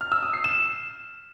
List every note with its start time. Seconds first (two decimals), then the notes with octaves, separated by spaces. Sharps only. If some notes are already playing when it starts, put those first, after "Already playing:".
0.01 F6
0.12 E6
0.23 D#6
0.33 C7
0.44 E7